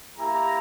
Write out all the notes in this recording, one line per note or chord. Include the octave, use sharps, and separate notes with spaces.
A#3 E4 G4 A#5